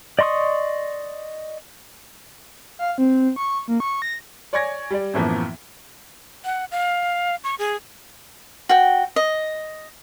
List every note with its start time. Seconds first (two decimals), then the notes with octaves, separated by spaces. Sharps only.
0.19 D5 D#5 C6 C#6 D#6
2.79 F5
2.98 C4
3.36 C#6
3.68 A#3
3.80 C#6
4.02 A#6
4.53 C#5 D5 G#5 C#6 G#6 A#6
4.91 G3 D5
5.14 F#2 A2 E3 F3 A#3 B3
6.45 F#5
6.71 F5
7.44 C#6
7.59 G#4
8.69 F#4 G5
9.16 D#5